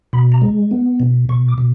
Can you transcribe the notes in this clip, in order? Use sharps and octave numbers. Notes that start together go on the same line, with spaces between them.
B2 B5
A#5
G#3
B3
B2
B2 C#6
D6
B2